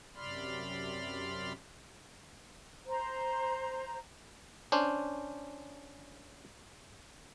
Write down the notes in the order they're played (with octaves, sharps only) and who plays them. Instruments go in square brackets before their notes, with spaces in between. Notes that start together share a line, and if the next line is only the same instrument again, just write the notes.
[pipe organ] F#2 C3 D5 B5 C6 F6
[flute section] C5 A#5
[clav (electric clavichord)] C#4 D4 C5